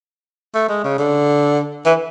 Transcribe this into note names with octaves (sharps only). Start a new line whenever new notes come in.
A3
G#3
C#3
D3
E3